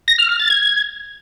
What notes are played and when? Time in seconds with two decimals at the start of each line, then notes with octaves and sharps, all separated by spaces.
0.08 A#6
0.18 F6
0.29 F6
0.39 A6
0.50 G#6